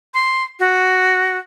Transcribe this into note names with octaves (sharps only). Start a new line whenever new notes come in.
C6
F#4